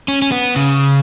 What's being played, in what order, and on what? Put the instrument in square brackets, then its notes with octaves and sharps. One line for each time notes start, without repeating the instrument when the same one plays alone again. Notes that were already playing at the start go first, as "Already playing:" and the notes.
[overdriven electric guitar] C#4
C#4
B3
C#3